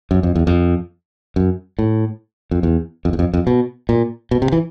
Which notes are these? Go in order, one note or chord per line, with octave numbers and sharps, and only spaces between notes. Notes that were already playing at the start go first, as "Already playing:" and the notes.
F#2
F2
E2
F2
F#2
A2
F2
E2
F2
E2
F2
F2
B2
A#2
B2
C3
E3